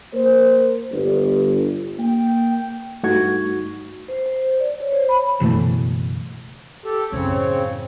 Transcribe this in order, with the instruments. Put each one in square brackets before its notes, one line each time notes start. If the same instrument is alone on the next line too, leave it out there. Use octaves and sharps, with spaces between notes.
[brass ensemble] A#3 A#4 C5
G1
A#3 G5
[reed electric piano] G2 A3 D#4 F#4 C#6 G#6
[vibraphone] C5
C5
D5
C#5
C5
B5
[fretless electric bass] F#1 B2 E3 A3
[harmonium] G4 A4
[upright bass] A1 F#2 [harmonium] C#3 C4 C#5